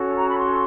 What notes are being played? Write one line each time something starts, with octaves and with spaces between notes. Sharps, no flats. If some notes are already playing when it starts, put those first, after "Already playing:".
Already playing: C#4 F#4 A4 C#5
A#5
B5
C6